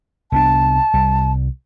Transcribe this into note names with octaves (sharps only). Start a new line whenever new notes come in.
C2 B3 D4 A5
C2 G3